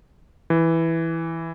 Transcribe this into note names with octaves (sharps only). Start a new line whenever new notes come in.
E3